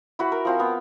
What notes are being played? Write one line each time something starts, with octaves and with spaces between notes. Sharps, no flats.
E4 F#4 B4
A#4
F3 C4 F5
B3